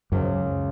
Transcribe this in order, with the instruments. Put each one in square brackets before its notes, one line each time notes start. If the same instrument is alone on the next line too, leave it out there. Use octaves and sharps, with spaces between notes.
[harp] C#2 [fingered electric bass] F#2